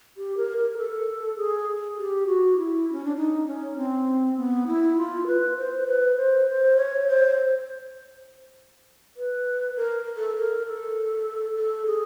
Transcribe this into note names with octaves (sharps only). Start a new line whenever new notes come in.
G4
A#4
A#4
A4
G#4
G4
F#4
E4
C#4
D4
D#4
C#4
C4
B3
E4
F4
B4
C5
B4
C5
C5
C#5
C5
B4
A#4
A4
A#4
A4
A4
G#4